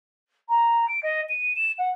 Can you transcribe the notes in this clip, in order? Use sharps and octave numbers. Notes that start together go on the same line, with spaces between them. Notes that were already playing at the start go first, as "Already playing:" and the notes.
A#5
D7
D#5
D#7
E7
F#5